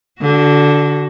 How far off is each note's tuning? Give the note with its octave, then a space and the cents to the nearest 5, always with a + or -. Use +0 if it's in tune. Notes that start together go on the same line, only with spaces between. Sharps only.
D3 -5 F#4 +20